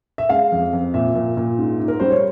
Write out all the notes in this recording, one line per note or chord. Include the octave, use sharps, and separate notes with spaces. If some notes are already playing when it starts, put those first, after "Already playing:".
E5
G#3 F5
F2
F2
A#2 E5
A#2
A#2
G#2
G#2
A#4
G3 C5
C#5